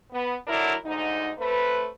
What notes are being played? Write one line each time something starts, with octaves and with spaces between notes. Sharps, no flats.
B3
D3 F#3 D4 E4 A#4
D2 G#2 D#4
A3 C4 B4